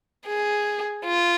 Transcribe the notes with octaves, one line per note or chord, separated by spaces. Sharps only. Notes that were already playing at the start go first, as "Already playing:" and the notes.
G#4
F4